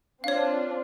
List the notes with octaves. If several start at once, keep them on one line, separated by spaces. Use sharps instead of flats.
C4 D4 F4 C#5 F5